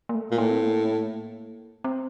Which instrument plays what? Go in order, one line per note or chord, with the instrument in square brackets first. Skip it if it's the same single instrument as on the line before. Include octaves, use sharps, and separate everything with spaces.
[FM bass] A#3
A3
[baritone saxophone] A#2
[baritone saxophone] A2 [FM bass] A#3
[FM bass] C4
A#3
C4